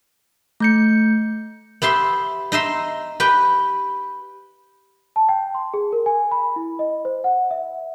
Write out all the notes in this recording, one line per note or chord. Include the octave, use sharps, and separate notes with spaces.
A3 G6 C#7
B3 G4 E5 C6
D#4 D#5 E5 C6
G4 B4 G5
A5
G5
C6
G#4
A#4
G#5
B5
E4
D#5
C5
F#5
E5